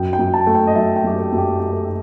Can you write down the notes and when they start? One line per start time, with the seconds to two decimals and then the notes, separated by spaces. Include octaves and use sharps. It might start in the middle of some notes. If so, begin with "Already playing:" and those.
Already playing: F#2 G5
0.13 G5
0.19 F#2
0.34 A5
0.47 A3
0.55 G5
0.67 D#5
0.75 F#3 E5
0.96 G5
1.04 F#2 G4
1.18 A4
1.32 F#2
1.38 G4
1.59 A3 G4
1.73 A4
1.85 G4